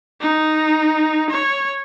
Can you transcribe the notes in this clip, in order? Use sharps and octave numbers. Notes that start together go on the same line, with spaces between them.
D#4
C#5